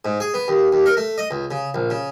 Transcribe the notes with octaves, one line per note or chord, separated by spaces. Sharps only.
G#2
G#4
B3
D#2
D#2
A#4
A3
D#5
C#2
C#3
A#1
C#3